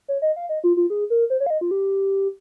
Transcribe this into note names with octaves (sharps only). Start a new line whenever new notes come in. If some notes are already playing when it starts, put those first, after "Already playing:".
C#5
D#5
F5
D#5
F4
F4
G#4
A#4
C5
C#5
F5
D#5
F4
G4